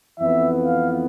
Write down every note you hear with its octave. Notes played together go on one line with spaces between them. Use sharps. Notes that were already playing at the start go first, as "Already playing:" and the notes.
F2 E3 B3 E5
F5